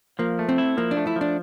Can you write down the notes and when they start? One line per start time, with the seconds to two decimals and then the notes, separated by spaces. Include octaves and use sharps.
0.19 F3 A#3
0.39 A3
0.49 C4
0.58 E4
0.77 F3 A#3
0.91 D4
0.97 A3
1.07 E4
1.16 F3
1.21 D4